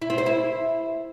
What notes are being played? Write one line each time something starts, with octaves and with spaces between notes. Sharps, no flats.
E4
C4
C5
E4